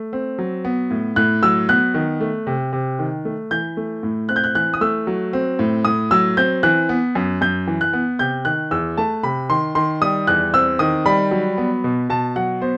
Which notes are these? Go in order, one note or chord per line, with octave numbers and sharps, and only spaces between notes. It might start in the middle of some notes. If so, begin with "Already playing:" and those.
Already playing: A3
C4
F#3
B3
A2
A2 F#6
F#3 E6
B3 F#6
D#3
A3
C3
C3
D#3
A3
E3 G6
A3
A2
C4 F#6
G6
F#6
E3 F#6
D#6
A3 E6
F#3
C4
A2
A2 D#6
F#3 E6
C4 G6
E3 F#6
B3
F#2
F#2 G6
E3
F#6
B3
C3 G6
D#3 F#6
E2 E6
A3 A5
C3 B5
D#3 C6
D#3 C6
G3 D#6
E2 F#6
C4 E6
D#3 D#6
G3 B5
F#3
B3
B2
B2 A5
F#3 F#5
B3 C5